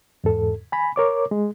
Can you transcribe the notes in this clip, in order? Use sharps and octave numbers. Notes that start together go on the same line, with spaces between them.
E2 G#2 A4
G#5 B5
A#4 C#5 D6
G#3